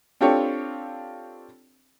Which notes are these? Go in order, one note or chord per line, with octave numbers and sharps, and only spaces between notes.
C4 D4 F4 G4 A4 C#5